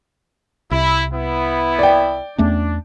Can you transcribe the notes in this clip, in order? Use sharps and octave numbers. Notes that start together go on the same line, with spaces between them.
C2 E4
B3 E4
D5 G5
E2 A3 C#4 D4